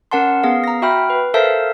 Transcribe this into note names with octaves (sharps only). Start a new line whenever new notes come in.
C#4 A#4 F#5 A5 C6
B3 G#4 F5
A#5 A#6
F#4 E5 G5 B5 F6
B4
A4 A#4 C5 E5 F5 A5